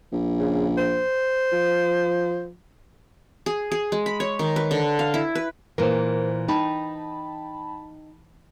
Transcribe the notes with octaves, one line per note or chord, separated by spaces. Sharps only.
A#1
C#3
C5
F3
G#4
G#4
G#3
B5
C#5
D#3
B4
D3
F5
E4
B4
A#2 E3 A#4 C5
D#4 G5 A5 B5